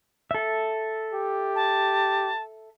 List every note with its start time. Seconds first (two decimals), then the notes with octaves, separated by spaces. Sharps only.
0.31 A4 E5
1.13 G4
1.56 A5